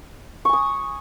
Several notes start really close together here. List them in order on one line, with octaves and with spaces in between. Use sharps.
C#6 G#5 D#6